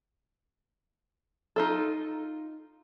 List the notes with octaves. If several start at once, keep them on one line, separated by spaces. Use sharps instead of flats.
D#4 F4 A4